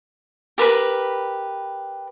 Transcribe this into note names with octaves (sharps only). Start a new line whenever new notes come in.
G4 A#4 B4 B5